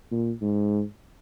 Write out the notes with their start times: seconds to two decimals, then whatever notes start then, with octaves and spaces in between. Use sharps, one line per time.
0.12 A#2
0.41 G#2